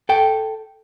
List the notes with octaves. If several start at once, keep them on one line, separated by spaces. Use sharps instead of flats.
A4 G5